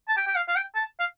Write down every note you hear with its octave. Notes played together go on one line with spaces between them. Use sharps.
A5
G5
G5
F5
F5
G5
A5
F5